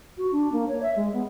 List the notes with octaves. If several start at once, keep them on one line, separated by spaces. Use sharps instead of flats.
F#4
D4
A#3
C#5
E5
G#3
B3